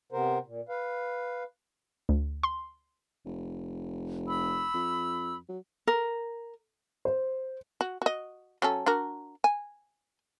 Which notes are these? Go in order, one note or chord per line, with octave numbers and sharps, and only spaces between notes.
C3 B3 A#4 C5
A#2
B4 F5
D2
C6
F1
B5 E6
F2
F#3
A#4
C5
F#4
F#4 D#5
F#3 C#4 A4
D4 F#4 A#4
G#5